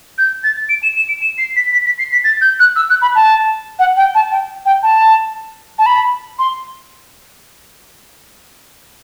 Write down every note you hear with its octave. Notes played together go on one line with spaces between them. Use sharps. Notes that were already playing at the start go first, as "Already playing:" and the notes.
G6
A6
D7
E7
E7
D7
E7
C7
B6
B6
B6
C7
B6
A6
G6
F#6
E6
F#6
B5
A5
F#5
G5
A5
G5
G5
A5
A5
B5
C6